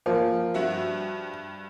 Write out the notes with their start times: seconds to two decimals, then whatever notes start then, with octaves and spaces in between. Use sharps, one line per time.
0.06 F3 A#3
0.54 G2 F#4 E5